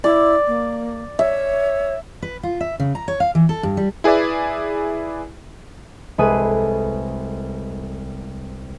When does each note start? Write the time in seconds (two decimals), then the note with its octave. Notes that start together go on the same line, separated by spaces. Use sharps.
0.04 E4 D5
0.47 A#3
1.19 C#5 E5
2.22 B4
2.43 F4
2.61 E5
2.80 C#3
2.95 A#5
3.08 C#5
3.20 F5
3.35 E3
3.49 A4
3.63 G2
3.77 G3
4.04 E4 G#4 B4 D5 E5
6.18 C2 G#3 G#4 A4 B4 G#5